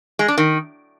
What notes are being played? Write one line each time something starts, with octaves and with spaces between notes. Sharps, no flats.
G#3
D4
D#3